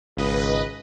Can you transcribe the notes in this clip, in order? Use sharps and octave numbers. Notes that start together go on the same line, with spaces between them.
G#1 C#2 B4 D#5